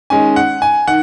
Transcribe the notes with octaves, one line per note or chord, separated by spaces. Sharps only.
D#3 G#3 C#4 G#5
F#5
G#5
D#3 F#5